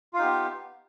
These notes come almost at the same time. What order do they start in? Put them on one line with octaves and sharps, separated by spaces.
F4 F5 D#4 G4 B3